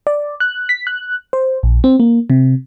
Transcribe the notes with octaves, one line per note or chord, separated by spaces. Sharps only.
D5
F#6
B6
F#6
C5
A#1
C4
A#3
C3